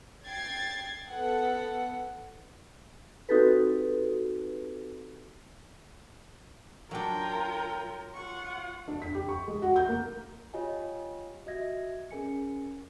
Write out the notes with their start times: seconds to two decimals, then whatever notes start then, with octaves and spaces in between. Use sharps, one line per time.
0.25 G5 G#6 A6 C7
1.08 B3 A4 F#5
3.29 C4 D#4 F#4 G4 A4 B4
6.91 F#3 D4 F4 A#4 G5
8.14 F4 F#5 C#6
8.88 D4
9.02 B6
9.14 G4
9.29 C#6
9.48 G#3
9.62 F#4
9.76 G6
9.88 A#3
10.54 F4 G4 C#5 D#5 G#5
11.46 F#4 D#5 E5 G#6 A#6
12.11 C#4 G#4 A#4 G#5 C#7